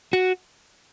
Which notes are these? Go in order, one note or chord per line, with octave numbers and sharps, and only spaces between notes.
F#4